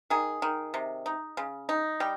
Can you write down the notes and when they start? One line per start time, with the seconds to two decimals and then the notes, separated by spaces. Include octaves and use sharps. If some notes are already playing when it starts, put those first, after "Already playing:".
0.10 D#3 G#4
0.42 D#3
0.74 C3
1.06 D#4
1.37 C#3
1.69 D#4
2.00 G3 G5